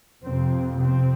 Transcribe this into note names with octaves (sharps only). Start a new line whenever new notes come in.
F2 C3 C4
C4